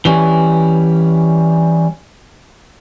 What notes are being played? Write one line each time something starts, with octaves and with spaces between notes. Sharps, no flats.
E3 G3 C#4